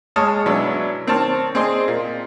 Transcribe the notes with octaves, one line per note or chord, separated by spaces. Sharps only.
G#3 C#5 D#5 A5 D#6 F6
B2 F#3 C#4 D4 E4 E6
D#3 C4 C#5 A5 F6
C4 G#4 D5 D#5 C6
A#2